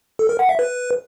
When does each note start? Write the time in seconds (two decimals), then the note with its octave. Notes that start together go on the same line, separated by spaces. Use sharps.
0.19 A4
0.29 A#4
0.39 F#5
0.49 E5
0.59 B4